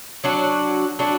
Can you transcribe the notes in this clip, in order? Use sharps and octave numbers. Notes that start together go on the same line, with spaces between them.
F#3 D4 F#4
F#3 D4 F#4